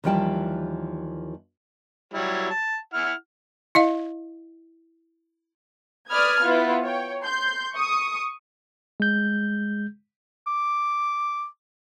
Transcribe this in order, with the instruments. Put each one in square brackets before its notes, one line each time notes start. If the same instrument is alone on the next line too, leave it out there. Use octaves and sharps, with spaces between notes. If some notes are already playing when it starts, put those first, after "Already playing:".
[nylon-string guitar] D#2 E3 F3 G3 G5 A5
[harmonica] F#3 G3 E4
A5
E4 F#5 F6
[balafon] E4 D#5 F5
[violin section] B4 D5 B5 D#6 F6 G#6
B3 E4 F4 B4
C#5 G5
C6 G6
C#6 D#6
[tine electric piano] G#3 G6
[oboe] D6